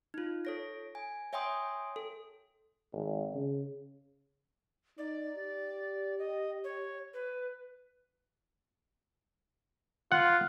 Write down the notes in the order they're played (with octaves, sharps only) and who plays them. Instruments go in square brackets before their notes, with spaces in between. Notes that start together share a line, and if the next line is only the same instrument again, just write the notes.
[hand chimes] D#4 F4
A4 C#5 A#6
G#5
C#5 E5 G5 G#5 C6 D#6
A4
[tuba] G#1
C#3
[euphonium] D#4 [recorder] D5
[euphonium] G4
[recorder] D#5
C#5
B4
[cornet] F4 [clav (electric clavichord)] F#5